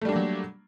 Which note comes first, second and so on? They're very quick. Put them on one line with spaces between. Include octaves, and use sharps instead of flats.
A3 G3 D4 A#3 F#3